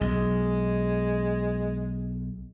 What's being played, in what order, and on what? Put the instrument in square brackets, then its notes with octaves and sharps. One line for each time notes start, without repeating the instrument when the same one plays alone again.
[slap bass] B1 [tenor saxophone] G#3